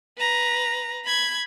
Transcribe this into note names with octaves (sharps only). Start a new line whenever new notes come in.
B4 A#5
B5 G#6